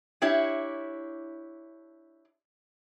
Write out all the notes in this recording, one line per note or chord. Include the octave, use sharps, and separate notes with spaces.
D4 E4 G4 C#5